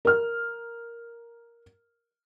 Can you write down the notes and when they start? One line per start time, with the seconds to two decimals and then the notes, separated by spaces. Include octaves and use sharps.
0.05 A#4 F6